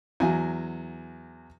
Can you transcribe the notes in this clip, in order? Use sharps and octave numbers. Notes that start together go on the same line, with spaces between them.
E2 F#3 G#5